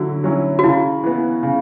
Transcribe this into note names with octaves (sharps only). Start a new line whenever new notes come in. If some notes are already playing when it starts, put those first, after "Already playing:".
Already playing: D3 F#3 E4 F#4
F#3 C#4 E4
F#4
C#3 E4
E3 B3
C#3